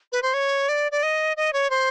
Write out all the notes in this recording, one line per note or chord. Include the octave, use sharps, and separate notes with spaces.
B4
C5
C#5
D5
D5
D#5
D#5
C#5
C5